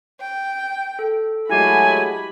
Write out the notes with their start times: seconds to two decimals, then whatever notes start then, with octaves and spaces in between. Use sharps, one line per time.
0.21 G5
0.99 A4
1.49 F#3 G#3 A3 E4 F#4 G4 G#5 B5